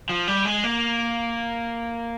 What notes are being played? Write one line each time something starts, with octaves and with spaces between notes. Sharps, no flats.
F3
G3
G#3
A#3